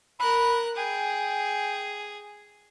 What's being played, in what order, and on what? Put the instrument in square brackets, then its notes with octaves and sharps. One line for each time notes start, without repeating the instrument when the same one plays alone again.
[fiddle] A#4 F#6 [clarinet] B5
[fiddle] G#4 [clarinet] G5